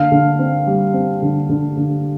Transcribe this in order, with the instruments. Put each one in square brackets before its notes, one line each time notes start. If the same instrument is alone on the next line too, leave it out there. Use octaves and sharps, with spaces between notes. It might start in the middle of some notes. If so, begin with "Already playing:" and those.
Already playing: [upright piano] D3 F5
D3
C4
G3
C4
D3
D3
D3